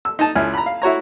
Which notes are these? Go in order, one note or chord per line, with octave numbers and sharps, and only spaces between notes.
E6
D#4 A5
C#2 E4 G#5 F6
A#5 B5
F5
E4 F#4 C#5 A#5